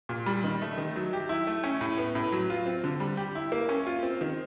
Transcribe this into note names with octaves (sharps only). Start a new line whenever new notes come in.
A#2
G3
D#3
A3
D#3
F#3
G4
E4
A3
C#4
A2
B3
A2
F#3
F4
C4
D3
G3
G4
E4
A#3
C#4
F4
C4
D#3